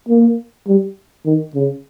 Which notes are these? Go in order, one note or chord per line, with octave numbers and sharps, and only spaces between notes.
A#3
G3
D#3
C#3